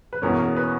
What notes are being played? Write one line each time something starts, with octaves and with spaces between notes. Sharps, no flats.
B4
E2 B2 A#3 C#4 A#4
A#4
B4